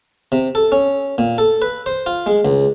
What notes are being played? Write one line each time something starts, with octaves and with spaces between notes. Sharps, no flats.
C3
A4
C#4
A#2
A4
B4
C5
F4
G#3
C#2